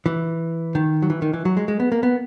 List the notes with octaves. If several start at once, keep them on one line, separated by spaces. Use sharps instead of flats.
E3
D#3
F#3
E3
D#3
E3
F#3
G#3
G#3
B3
A#3
B3